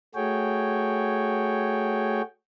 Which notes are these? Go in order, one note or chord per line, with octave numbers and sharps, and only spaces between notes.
A3 F#4 G#4 C#5 G5